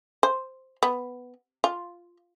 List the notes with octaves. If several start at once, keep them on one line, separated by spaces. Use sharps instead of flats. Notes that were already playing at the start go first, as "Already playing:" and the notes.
C5
B3
F4